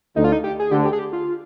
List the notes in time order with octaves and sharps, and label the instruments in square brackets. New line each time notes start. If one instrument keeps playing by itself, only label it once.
[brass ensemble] D2 D3 [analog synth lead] D#4
[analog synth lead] F4
D#4
G4
G#4
[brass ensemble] D2 D3 [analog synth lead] G4
[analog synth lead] G4
G#4
G4
F4